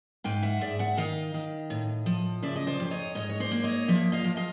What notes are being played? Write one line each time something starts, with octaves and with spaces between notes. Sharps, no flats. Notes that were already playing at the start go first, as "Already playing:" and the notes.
G#2 F5 G5
E5 F#5
G#2 D5 E5
E5 F#5
D#3 D#5 F5
D#3
A2
F3
C#3 D5 E5
D#5
C5 D5
F2
C#5 D#5
G#2 C#5 D#5
C#5
C5 D5
A#3
C#5 D#5
F3 D5 E5
D#5 F5
F3
D#5 F5